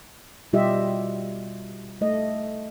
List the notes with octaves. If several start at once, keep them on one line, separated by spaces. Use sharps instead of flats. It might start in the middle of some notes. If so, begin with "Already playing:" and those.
B2 G3 F4 G4 D#5 E5
A3 D#5